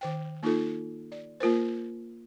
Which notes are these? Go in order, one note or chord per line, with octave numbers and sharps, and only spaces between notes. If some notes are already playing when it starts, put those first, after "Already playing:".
D#3 C5 G5
A#3 D#4 F4 A4
D5
A#3 F4 A#4 C5